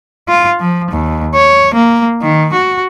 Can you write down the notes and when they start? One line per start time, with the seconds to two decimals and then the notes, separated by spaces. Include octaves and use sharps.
0.29 F4
0.60 F3
0.91 D#2
1.35 C#5
1.74 A#3
2.22 D#3
2.53 F#4